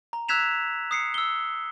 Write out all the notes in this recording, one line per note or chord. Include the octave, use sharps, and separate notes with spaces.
A#5
E6 F#6 G#6 B6 E7 F7
D#6 C7 C#7
E6 G7